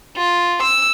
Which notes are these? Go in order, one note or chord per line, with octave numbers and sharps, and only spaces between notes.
F4
E6